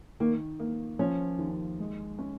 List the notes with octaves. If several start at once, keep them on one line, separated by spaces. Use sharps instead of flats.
D#3 A#3
A#3
F3 C#4
D#2
G#3
C#4